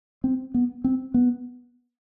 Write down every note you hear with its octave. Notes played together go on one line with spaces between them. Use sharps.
C4
B3
C4
B3